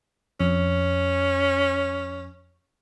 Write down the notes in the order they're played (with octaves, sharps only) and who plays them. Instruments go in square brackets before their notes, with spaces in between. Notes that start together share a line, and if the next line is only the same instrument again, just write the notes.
[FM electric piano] F2 [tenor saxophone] C#4